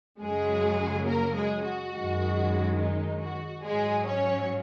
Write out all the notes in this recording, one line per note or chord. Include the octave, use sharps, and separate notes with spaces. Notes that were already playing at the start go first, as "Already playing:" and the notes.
F#2 C#3 F#3 G#3 G#4
A#3 A#4
G#3 G#4
F#4
F#2 D#3 G#3
D#4
F#4
G#2 F#3 G#3 G#4
C#4 C#5